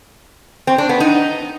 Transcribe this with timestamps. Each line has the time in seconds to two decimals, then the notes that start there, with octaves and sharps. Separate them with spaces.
0.67 C4
0.78 D4
0.89 B3
1.00 D#4